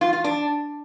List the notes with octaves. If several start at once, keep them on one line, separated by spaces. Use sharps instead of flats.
F4
F4
D4